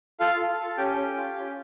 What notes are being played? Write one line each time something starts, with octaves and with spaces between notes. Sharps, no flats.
F4 A4 F5
F4
A4
C#4 G4 G5
C#4
F4
C#4